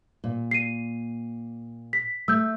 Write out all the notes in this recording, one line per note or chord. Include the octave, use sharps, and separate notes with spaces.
A#2
C7 D#7
B6
A3 E6 G6